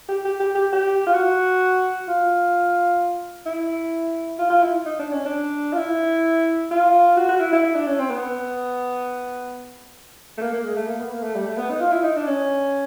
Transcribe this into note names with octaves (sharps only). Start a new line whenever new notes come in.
G4
G4
G4
G4
G4
F4
F#4
F4
E4
F4
F4
E4
D#4
D4
C#4
D4
F4
E4
F4
F#4
F#4
E4
E4
E4
D4
C#4
C4
B3
A3
A#3
A#3
G#3
A3
A#3
B3
A#3
A3
G3
A3
B3
D#4
F4
E4
D#4
D4
C#4